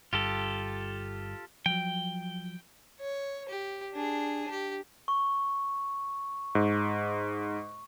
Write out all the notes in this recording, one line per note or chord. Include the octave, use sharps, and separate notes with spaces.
G1 G2 F4 G4 A4
F3 F#3 G5
C#5
G4
D4 G#4
G4
C#6
G#2